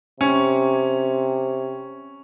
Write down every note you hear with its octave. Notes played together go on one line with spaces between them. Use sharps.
C3 C#4